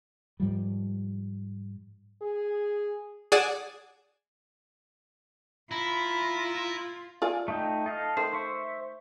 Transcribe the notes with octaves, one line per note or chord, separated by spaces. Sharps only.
G#2 F3 G3
G#4
G#4 D5 F#5 E7
E4 F4 A#5 B5
F4 D5 G#5
A3 D#4 G5
A4 D#5 F5
D#3 A3 C5
C5 E5 C#6